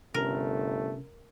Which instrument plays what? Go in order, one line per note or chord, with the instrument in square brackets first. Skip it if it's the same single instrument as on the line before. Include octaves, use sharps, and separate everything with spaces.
[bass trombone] G1 [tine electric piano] C3 C#4 [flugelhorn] A3 [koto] A#4